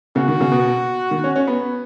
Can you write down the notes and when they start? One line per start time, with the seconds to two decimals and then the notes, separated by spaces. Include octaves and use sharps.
0.16 C#3 F#4
0.28 D#3
0.41 C#3
0.52 B2
1.11 D#3
1.24 C#4
1.36 C#4
1.48 B3